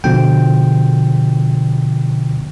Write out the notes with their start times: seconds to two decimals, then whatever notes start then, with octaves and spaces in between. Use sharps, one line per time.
0.04 B2 D3 F3 G5